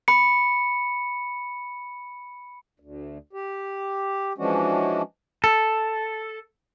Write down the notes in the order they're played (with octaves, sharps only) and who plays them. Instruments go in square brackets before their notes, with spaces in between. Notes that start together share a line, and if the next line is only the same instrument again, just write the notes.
[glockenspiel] B5 C#7
[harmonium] D2
G4
E3 F3 G#3 C#4 D4 F#4
[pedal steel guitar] A4